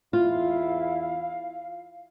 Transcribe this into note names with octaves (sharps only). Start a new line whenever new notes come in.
E2 E4 F4 F5